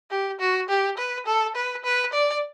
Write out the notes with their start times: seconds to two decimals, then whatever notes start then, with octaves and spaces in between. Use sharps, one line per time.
0.11 G4
0.40 F#4
0.69 G4
0.98 B4
1.26 A4
1.56 B4
1.84 B4
2.13 D5